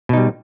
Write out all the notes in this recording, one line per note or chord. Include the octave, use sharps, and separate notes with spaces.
B2 G3 D#4